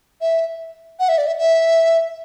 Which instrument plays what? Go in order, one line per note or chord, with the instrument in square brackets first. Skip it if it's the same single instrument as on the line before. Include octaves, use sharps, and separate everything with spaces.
[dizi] E5
F#5
E5
D5
E5
E5